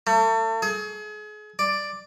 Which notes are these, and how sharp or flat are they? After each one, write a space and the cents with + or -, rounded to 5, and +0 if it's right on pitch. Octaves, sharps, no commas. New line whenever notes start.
A3 +35
G#4 +35
D5 +5